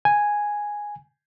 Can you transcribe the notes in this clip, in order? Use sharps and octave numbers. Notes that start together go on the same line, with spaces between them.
G#5